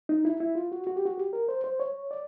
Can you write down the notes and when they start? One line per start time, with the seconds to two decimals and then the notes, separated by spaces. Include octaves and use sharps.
0.09 D#4
0.25 E4
0.40 E4
0.55 F4
0.72 F#4
0.87 F#4
0.96 G4
1.05 F#4
1.18 G4
1.33 A#4
1.48 C5
1.64 C5
1.80 C#5
2.11 D5